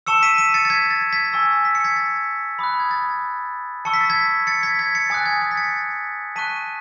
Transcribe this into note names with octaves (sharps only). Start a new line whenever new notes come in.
A5 C#6 E6 C#7 E7
B6 D#7
B6 D#7
A6 C#7
A6
G#6 B6
A6
G#6 B6
G#5 C#6 E6
B6
C#7
G#6 B6
A6
B5 D#6 F#6
G#6
A6
A5 C#6 E6 C#7
B6
A6
G#6 B6
A6 C#7
G#6 B6
G#6 B6
A6 C#7
G#5 D#6 F#6 A6
G#6
A6
B6
A6 C#7
A5 C#6 F#6 B6 D#7